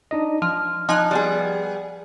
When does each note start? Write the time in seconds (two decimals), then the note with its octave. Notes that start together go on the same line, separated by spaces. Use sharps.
0.11 D4 D#4 D#5
0.42 F3 F6
0.89 F3 D#4 G#5 F#6
1.11 G3 B3 G#4